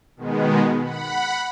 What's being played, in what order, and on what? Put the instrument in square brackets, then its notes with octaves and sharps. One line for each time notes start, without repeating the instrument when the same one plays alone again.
[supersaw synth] B2 D#3 G#3 B3
F#5 B5